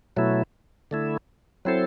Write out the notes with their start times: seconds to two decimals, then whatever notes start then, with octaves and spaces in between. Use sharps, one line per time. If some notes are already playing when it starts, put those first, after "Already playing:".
0.17 B2 F#3 A3 E4
0.91 D3 A3 E4
1.65 F#3 C4 E4 A4 C5